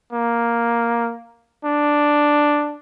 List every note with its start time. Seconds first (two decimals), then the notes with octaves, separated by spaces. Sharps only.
0.13 A#3
1.65 D4